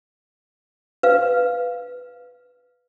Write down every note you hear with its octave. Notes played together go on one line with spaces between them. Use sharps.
B4 F5